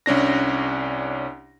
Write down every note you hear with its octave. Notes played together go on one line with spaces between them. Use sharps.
C2 C#4 D4 A#6